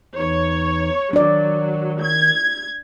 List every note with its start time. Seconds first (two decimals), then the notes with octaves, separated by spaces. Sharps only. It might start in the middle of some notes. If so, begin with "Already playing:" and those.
0.16 E2 E3 D#4 C#5
1.13 D#3 F#3 D4 D5
2.01 G#6